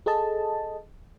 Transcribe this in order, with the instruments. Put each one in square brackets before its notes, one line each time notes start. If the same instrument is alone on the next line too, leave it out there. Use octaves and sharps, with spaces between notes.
[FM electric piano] G#4 A4 D#5 A5